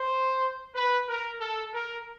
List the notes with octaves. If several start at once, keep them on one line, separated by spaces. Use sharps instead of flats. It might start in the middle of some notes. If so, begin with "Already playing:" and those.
Already playing: C5
B4
A#4
A4
A#4